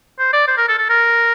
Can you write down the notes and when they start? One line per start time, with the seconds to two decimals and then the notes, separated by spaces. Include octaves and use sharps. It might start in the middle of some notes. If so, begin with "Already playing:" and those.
0.19 C5
0.33 D5
0.48 C5
0.58 A#4
0.69 A4
0.79 A4
0.90 A#4